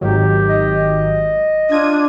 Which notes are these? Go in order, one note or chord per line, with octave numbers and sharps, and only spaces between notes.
G#1 D#3 F#3 G4
D#5
D4 F4 D#6 G#6 D#7